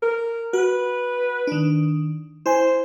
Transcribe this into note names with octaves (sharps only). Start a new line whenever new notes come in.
A#4
F#4 B4
D#3 D4
E4 C5 G#5